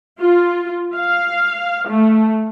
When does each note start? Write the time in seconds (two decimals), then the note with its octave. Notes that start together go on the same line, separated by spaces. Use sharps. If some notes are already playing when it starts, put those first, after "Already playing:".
0.20 F4
0.95 F5
1.89 A3